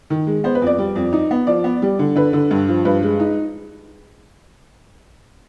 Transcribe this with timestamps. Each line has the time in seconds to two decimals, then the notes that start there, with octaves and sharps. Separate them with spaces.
0.10 D#3
0.27 G#3
0.44 B3 C5
0.55 B4
0.62 F2 D5
0.78 G3
0.96 F2
1.13 D#4
1.31 B3
1.47 F3 D5
1.64 B3
1.82 G3
1.99 D3
2.16 D3 B4
2.33 D3
2.51 G2
2.68 F3
2.85 G2 B4
3.03 G#3
3.20 D#4